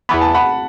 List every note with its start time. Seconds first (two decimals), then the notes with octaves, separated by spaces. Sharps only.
0.09 E2 E3 B3 B5
0.21 A5
0.34 F#5 B5